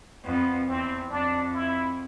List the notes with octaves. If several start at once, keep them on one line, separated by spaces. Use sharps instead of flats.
F2 B3
E2 C4
F2 D4
E4